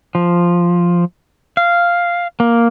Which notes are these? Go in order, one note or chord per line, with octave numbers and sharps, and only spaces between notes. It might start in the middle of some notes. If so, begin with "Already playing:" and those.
F3
F5
A#3